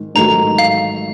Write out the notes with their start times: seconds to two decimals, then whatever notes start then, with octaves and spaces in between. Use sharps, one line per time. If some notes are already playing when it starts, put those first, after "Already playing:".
Already playing: G#2 D#3
0.15 A1 G#2 D#3 F#3 A3 A#5
0.58 F5